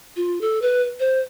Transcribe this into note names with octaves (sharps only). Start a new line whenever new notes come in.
F4
A4
B4
C5